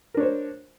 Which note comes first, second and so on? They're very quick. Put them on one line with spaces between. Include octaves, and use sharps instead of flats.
A#4 D4 C#5 C5